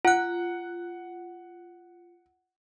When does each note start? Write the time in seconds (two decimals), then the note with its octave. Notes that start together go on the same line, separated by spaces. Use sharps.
0.05 F4 F#5 F#6